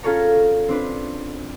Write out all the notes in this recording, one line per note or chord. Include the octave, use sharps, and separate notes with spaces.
C#4 F4 G#4 A4 C#5 A#5
C4 D4 B4